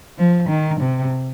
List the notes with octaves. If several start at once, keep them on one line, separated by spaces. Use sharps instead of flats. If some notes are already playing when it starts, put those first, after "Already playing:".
F3
D#3
C3